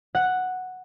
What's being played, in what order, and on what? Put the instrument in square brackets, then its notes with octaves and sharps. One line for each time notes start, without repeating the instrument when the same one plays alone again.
[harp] F#5